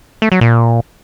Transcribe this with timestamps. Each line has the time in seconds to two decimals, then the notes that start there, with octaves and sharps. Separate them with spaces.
0.22 A3
0.32 F#3
0.41 A#2